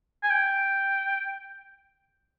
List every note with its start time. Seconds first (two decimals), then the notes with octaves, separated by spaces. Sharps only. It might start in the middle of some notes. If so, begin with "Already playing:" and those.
0.23 G#5
0.30 G5